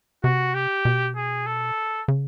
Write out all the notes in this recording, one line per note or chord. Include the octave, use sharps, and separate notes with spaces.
C3 F#4
G4
B2
G#4
A4
C#3